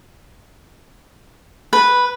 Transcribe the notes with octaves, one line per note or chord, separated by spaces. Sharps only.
B4